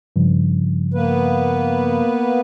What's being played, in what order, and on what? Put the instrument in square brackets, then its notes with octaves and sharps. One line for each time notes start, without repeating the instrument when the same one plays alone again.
[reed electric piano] G2 C#3 F3
[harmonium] A#3 B3 B4